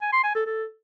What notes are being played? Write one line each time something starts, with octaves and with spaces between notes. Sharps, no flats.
G#5
C6
G#5
A4
A4